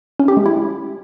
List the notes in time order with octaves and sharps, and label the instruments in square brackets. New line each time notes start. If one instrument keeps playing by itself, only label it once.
[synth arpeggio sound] C#4
G4
G#3
E4